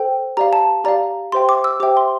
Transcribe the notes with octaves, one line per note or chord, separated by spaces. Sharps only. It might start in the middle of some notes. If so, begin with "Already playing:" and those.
Already playing: A4 C5 G5
G4 D5 F5 A#5
A5
G4 D5 F5 A#5
G4 C5 E5 G5 C6
D6
E6
G4 C5 E5 G5 D6
C6